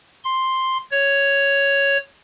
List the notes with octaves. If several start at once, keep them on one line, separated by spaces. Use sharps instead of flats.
C6
C#5